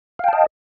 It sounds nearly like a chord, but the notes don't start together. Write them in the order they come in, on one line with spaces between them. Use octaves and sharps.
F5 G5 A5 D#5